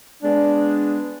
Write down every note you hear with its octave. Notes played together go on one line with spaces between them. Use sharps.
G#3 B3 D4